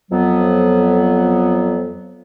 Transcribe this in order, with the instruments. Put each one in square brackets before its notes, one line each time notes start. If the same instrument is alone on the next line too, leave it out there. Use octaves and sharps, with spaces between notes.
[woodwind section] F2 F#3 B3